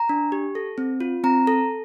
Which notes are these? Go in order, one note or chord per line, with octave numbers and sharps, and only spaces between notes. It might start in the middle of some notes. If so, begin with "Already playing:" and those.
Already playing: A#5
D4
G4
A4
C4
F4
C4 A#5
A4